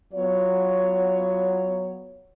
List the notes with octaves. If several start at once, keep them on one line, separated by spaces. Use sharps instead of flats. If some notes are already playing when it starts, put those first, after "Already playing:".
F#3 B3 F4 C#5